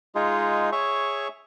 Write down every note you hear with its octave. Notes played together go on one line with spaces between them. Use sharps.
G#3 D#4 F4 G#4
G#4 C#5 E5 C#6